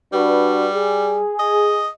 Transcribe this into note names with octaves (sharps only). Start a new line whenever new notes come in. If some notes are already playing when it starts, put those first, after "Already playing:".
G3 D4 F#4 B4
G#4
D#5